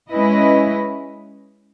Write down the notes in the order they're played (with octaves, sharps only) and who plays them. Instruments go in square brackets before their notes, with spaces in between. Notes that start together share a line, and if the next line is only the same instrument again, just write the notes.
[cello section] G#3 C#4 E4 B4 D#5